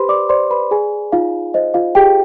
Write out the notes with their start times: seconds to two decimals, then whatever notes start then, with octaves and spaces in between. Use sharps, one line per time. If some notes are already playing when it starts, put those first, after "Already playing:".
Already playing: G4 B4 C5 B5 C6
0.09 D5 D6
0.29 C5 D5 C6
0.51 B4 B5
0.71 G#4 G#5
1.12 D#4 F4 F5
1.54 C5 D#5
1.74 F4 F5
1.95 G4 G#4 G5